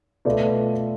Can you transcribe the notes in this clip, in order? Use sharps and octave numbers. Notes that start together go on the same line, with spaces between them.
B2 A3 F4 B4 D5